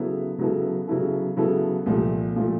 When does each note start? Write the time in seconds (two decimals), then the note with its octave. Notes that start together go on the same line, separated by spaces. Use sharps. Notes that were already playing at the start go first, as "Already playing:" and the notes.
Already playing: C#3 F#3 B3 E4 A4
0.38 C#3 F#3 B3 E4 A4
0.88 C#3 F#3 B3 E4 A4
1.37 C#3 F#3 B3 E4 A4
1.86 C2 A#2 F3 A3
2.36 A#2 F3 A3